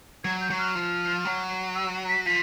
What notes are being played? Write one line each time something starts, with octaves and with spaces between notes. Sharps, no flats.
F#3 G#6
G6
F#3
F6
F3
F#3
E6
B6
F3 B6